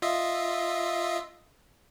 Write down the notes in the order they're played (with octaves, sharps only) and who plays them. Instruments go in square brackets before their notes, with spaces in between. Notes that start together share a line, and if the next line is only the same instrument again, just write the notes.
[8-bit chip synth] F4 D#5 E5